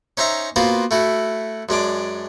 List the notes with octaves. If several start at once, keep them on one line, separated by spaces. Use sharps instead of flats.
C#4 D#4 C5 E5 A#5
A#3 B3 F4 F#4 C5
A3 E4 F#4
F#2 G#3 D4 D6